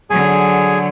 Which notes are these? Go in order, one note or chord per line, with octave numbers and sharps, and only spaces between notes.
D3 F#3 G#4 G#5